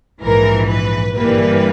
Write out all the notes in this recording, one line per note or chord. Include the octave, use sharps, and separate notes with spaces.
A#1 G#2 E3 A#4
B4
G1 G2 E3 G3 A#3 B4